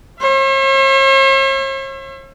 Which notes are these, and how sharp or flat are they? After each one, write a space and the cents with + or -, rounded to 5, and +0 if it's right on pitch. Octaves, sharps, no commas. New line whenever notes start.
C#5 -45 E5 +35